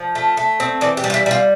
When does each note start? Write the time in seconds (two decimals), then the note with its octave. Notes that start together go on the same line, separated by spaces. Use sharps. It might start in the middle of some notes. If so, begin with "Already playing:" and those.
Already playing: F3
0.15 A3
0.37 A3
0.60 C4
0.81 E3 D5
0.97 G4
1.04 G3
1.10 F4
1.14 E4
1.26 G3 F4